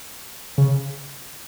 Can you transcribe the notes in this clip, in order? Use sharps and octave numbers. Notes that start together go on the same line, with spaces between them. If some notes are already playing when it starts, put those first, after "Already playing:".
C#3